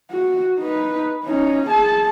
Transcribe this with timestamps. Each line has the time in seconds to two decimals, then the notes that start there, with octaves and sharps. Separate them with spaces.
0.11 F#4
0.59 D#4 B4
1.25 C#4 D#4
1.67 G#4 A5